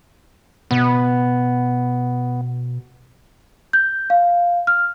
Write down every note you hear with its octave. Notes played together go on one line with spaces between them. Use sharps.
B2 B3
G6
F5
F6